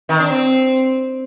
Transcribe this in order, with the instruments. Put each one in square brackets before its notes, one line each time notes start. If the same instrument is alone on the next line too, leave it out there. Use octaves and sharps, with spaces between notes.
[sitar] D#3
D4
C4